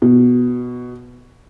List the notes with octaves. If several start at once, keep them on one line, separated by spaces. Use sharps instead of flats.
B2